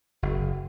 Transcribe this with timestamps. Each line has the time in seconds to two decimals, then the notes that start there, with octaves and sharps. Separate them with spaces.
0.23 F#1